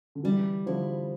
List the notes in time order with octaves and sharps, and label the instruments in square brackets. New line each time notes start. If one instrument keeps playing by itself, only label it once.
[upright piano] D3
[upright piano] E3 [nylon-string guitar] G3
[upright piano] D3 F3 [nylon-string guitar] E4